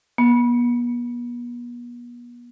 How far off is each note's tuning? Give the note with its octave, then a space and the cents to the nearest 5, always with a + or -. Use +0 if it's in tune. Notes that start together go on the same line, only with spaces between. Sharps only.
B3 -40